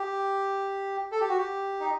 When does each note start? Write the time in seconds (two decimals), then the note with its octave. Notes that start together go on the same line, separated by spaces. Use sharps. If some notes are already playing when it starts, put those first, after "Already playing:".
Already playing: G4
1.12 A4
1.21 G4
1.29 F#4
1.38 G4
1.80 D#4